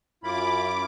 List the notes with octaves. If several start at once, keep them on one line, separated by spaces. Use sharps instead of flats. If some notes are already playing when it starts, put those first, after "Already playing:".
F#2 E4 F4 B5 D6